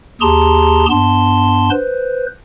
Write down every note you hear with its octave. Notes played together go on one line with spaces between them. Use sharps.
D#2 G4 G#4 A5 A#5 C6
G2 B3 A5 C6
B4 C5